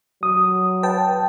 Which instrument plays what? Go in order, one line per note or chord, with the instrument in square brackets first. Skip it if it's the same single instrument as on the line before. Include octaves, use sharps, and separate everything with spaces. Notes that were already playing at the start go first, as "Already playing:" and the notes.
[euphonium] F#3 [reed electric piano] D#6
[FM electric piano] B4 G5 A5